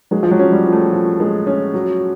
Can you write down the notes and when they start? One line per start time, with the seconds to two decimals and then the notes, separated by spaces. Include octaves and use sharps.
0.11 F#3 G#3
0.23 F3
0.31 F#3
0.39 C#4
0.52 G3
0.65 F3
0.73 A3
0.93 F3
1.20 G#3
1.47 C#4
1.74 F#3